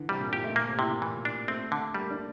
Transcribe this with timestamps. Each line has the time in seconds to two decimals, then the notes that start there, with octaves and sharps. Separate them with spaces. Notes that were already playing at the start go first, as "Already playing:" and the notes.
Already playing: D3 E3
0.09 C3 G3
0.20 A#2
0.32 A#2 G4
0.44 A3
0.55 A#2 A#3
0.67 C3
0.78 A2 C3
0.91 A#2
1.01 A#2 E3
1.25 D4
1.48 A3 C4
1.72 D3
1.94 G3 A#3
2.11 D4